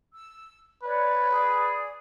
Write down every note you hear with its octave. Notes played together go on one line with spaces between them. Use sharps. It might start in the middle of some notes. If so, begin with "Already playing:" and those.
E6
B4 C#5 D5
G#4 D5